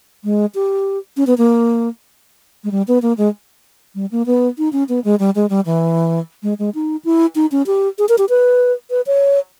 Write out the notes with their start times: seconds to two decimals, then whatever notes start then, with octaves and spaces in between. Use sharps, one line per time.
0.24 G#3
0.55 G4
1.17 C#4
1.27 B3
1.38 A#3
2.64 G#3
2.71 G3
2.88 B3
3.02 A#3
3.18 G#3
3.95 G3
4.12 A#3
4.26 B3
4.58 D#4
4.73 C#4
4.89 B3
5.04 G#3
5.19 G3
5.35 G#3
5.50 G3
5.66 E3
6.43 G#3
6.59 G#3
6.75 D#4
7.05 E4
7.35 D#4
7.52 C#4
7.67 G4
7.98 G#4
8.09 A#4
8.18 G4
8.29 B4
8.90 B4
9.07 C#5